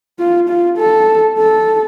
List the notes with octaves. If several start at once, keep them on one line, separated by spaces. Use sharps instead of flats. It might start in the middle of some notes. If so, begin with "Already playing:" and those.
F4
F4
A4
A4